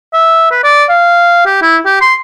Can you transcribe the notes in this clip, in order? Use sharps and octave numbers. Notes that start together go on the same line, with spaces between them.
E5
B4
D5
F5
G4
E4
G4
C6